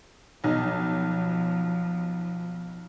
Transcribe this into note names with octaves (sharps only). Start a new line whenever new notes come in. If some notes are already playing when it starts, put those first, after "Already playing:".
B1 F3 D#4